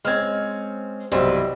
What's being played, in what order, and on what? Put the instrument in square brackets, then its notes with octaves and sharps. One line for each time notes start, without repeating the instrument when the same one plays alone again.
[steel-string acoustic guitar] G#3 C4 C#4 [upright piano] F6 G#6
[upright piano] B1 G3 C5 [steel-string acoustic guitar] C3 E3